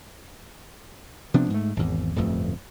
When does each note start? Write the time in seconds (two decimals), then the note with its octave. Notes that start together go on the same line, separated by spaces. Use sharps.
1.34 C3 F3 B3 D4
1.50 G#2 A3
1.77 G#1 E2
2.16 D1 G1 F2 A3